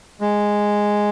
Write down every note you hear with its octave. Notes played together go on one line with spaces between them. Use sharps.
G#3